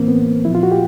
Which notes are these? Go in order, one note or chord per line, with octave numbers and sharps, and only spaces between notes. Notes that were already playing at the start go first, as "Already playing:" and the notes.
Already playing: A2 E3 A#3 C4
B3
A#2 F3 E4
F4
F#4
G4